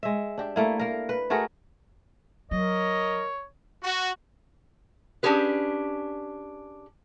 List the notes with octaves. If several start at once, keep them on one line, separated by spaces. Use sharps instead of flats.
G#3 E5
D4 G4
A3 A#3 E4
A#3 A#4
B4
A3 F#4 G#4 A#4
F#3 A#4 C#5 D#5
F#4
C#4 D4 G4 G#4 B4